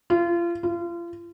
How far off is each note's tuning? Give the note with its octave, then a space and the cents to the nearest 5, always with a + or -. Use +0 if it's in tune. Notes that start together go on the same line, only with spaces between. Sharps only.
F4 -30
F4 -35